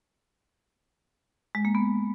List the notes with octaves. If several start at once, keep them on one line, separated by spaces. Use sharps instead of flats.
G#3
A#3
B3